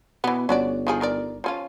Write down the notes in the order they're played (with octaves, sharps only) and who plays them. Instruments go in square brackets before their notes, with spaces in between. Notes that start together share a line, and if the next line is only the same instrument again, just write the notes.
[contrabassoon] B2 [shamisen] E3 B3
[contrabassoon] G1 [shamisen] C#4 F#4 D5
[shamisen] D#3 F3 G#4
D#3 A#4 D5
F3 C#4 F4